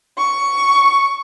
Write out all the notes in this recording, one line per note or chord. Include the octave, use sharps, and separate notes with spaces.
C#6